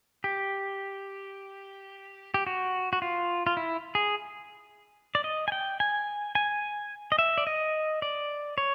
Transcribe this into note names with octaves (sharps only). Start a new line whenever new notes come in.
G4
G4
F#4
F#4
F4
F4
E4
G#4
D5
D#5
G#5
G5
G#5
G#5
D#5
E5
D5
D#5
D5
C#5